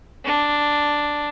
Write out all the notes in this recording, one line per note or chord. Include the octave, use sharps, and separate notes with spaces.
D4